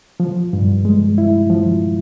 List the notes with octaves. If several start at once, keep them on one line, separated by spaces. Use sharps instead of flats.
F3
G2
G#3
E4
F3